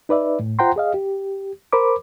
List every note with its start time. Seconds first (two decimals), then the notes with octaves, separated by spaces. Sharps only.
0.09 D#4 B4 D5 E5
0.40 A2
0.59 F4 C5 F#5 G5 A#5 C6
0.76 G#4 D#5 F5
0.94 G4
1.73 A#4 C5 B5 D6